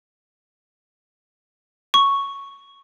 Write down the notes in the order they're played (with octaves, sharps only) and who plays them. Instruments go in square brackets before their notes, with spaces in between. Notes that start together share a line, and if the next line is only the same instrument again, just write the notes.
[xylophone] C#6